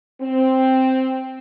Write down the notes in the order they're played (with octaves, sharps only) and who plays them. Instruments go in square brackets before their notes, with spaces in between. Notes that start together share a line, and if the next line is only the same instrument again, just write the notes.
[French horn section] C4